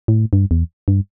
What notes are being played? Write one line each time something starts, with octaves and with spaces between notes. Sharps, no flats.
A2
G2
E2
G2